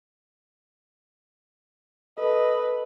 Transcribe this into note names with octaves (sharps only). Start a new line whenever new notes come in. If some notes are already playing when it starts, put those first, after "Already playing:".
A4 B4 D#5